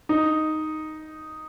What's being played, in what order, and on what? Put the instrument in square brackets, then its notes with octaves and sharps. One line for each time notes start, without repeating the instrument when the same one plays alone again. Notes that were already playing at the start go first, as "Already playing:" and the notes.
[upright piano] D#4